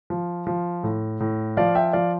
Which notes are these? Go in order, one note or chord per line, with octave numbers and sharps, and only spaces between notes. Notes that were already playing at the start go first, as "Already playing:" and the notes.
F3
F3
A2
A2
F3 D5 F5
E5 G5
F3 D5 F5